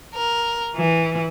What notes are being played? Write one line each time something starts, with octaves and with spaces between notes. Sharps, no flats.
A#4
E3